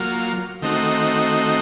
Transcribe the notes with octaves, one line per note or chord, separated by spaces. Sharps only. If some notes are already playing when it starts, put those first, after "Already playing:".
Already playing: F#3 A#3 F4
D#3 A3 C4 D#4 F#4